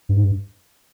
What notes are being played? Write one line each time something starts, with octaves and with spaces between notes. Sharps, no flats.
G2
G#2
G2